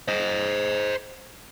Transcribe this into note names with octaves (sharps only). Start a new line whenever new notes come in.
C5 D#5